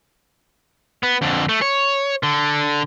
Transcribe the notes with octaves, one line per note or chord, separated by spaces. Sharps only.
B3
F2 D3
A3
C#5
D3